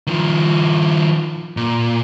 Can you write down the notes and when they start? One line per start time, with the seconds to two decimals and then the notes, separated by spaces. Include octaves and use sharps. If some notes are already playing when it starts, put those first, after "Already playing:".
0.07 D#3 F3
1.57 A#2